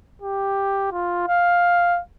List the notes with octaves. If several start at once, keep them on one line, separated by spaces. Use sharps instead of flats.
G4
F4
F5